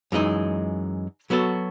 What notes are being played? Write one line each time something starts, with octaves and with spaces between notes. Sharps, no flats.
F#2 E3 G#3 D#4
F#3 B3 F#4 A4